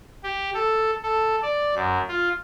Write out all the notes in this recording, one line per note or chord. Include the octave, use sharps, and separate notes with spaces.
G4
A4
A4
D5
F#2
F4